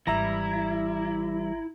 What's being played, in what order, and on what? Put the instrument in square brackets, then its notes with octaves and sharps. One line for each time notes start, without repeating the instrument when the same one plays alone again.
[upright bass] G#1 [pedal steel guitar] E3 G3 [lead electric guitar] E4 [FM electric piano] E5 A#5 A#6